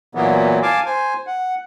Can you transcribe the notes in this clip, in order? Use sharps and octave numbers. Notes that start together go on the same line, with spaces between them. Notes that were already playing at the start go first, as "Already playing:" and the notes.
A#2 E3 F#3 A#3 B3
F5 G#5 A5 D6
C5 G#5
F#5